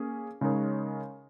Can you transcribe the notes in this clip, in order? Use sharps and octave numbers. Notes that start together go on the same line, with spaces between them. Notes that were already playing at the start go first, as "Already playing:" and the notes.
Already playing: A#3 C#4 G#4
C#3 G#3 D#4 A#4 C#5